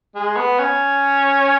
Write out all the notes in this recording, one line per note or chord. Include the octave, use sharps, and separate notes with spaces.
G#3
B3
C#4